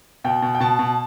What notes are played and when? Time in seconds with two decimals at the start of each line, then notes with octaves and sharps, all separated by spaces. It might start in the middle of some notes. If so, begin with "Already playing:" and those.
0.24 B2 G5
0.42 B2
0.55 G5
0.60 B2 A5
0.79 B2